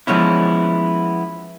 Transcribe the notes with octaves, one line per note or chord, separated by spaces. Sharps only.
F3 G#3 B3 C#4 E4